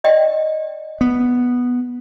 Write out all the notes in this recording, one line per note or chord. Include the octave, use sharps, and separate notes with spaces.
D5 D#5 G5
B3